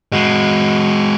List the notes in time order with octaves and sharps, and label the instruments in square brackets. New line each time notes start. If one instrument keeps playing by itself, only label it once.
[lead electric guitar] G#3 F#4